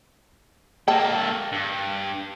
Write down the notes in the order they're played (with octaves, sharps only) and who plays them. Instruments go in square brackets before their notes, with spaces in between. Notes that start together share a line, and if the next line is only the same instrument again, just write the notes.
[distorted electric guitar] A#3 A4 [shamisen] G5 A5
[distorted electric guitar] G2